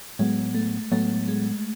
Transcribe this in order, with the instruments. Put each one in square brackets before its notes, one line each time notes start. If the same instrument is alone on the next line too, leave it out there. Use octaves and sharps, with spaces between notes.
[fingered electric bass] A2 F#3 B3 [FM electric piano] G#3
[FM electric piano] A3
[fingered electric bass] A2 F#3 B3 [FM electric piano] A3
[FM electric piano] G#3